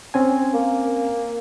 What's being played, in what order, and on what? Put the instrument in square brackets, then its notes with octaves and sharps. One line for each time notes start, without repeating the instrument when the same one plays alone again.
[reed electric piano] C4 C#4 G#5
[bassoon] A#3